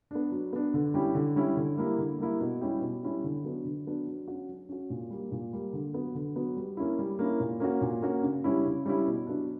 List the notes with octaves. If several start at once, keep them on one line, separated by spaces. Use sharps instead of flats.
B3 D4
F#3
B3 D4
D3
G3 C#4 E4 G4
D3
G3 C#4 E4 G4
D3
G3 A#3 E4
D3
G3 A#3 E4
B2
G3 C#4 E4 G4
B2
G3 C#4 E4 G4
D3
F#3 B3 D4
D3
F#3 B3 D4
F#3
C#4 F#4
F#3
C#4 F#4
A#2
G3 A#3
A#2
G3 A#3
D3
F#3 B3
D3
F#3 B3
G3
A#3 C#4 E4
G3
A#3 C#4 E4
A#2
A#3 C#4 F#4
A#2
A#3 C#4 F#4
C#3
G3 C#4 E4
C#3
G3 C#4 E4
B2
F#3 B3 D4